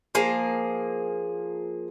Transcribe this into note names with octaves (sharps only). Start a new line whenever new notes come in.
F3 A#3 G#4